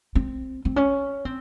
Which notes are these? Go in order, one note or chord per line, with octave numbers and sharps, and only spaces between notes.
C4
C4
C#4
C4